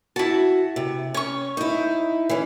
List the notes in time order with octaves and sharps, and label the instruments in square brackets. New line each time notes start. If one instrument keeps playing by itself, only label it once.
[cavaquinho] E4 A5 [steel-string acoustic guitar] F#4
[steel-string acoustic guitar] C3
[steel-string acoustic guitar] C#4 [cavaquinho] C#5 C#6
[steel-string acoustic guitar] D#4 E4
E3 C#4